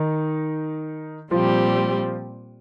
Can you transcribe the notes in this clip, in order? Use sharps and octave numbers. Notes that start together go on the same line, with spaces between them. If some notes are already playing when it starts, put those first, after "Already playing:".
Already playing: D#3 D#4
A#2 F3 G3 C4 F4 G4